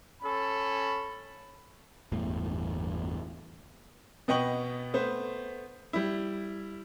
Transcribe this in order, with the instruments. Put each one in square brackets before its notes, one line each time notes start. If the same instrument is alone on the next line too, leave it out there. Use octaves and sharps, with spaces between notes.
[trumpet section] C#4 A4 B5
[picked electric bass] G1 E2 A2
[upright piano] B2 B3 D#5 G5 C#6 F#7
A3 B3 C5
G3 E4